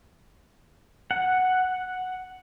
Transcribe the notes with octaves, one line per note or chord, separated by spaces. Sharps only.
F#5